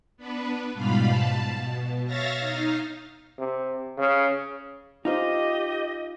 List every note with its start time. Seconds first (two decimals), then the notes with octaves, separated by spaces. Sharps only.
0.17 B3 D4 B4
0.74 G#2 B2 G3 F4 F5 B5
1.10 A5
1.57 B2
2.07 C#5 E5 F5 A6 A#6
2.40 D#4 F5
3.39 C3
3.98 C#3
5.05 D#4 F4 G4 C5 D#5